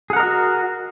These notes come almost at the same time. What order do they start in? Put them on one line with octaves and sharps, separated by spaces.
G#4 F#5 A#4 D#5 F#4